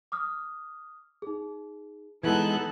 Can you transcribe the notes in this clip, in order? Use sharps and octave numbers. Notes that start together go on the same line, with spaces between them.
D6 D#6 F6
D#4 G#4
E3 G#3 B3 D#4 A4 F#6 G#6